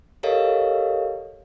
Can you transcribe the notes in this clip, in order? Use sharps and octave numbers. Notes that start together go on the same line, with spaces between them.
G4 A4 A#4 C#5 D#5 F5